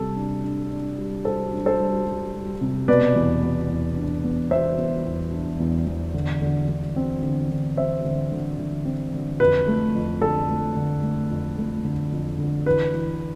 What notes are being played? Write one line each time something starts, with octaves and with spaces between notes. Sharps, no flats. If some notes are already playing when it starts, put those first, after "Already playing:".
Already playing: C3 G3 A4
D4
D4
D4
G3
G3 A4 C5
D4
A4 C5
G3
G3
G3
C3
B2 B4 D5
E2
B3
E2
D4
B3
B3 C5 E5
B3
E2
D4
E2
E2
D3
D3
D3
C4
D3
D3
C4 C5 E5
D3
D3
D3
C4
D3
F2 B4
A3
F2
D3 A4
A3
D3
A3
F2
A3
D3
F2
D3
E3 B4
E3